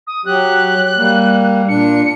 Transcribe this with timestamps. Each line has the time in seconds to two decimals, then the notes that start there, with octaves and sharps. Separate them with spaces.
0.07 D#6
0.26 F#3 G4 F#6
0.97 G3 A#3
1.69 A#2 D4 C#7